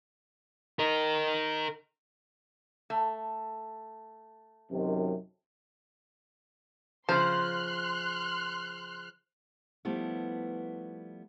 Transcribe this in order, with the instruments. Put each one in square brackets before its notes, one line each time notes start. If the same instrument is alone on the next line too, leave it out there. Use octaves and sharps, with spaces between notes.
[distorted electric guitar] A#4 D#5
[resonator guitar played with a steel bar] A3
[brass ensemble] F#2 C3 D#3
[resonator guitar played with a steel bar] C#3 F3 [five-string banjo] C5 [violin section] C6 F6 F#6
[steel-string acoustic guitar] F3 G3 A3 B3 E4